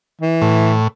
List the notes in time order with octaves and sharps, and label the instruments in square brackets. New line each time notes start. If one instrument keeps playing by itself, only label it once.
[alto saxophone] E3
[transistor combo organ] A2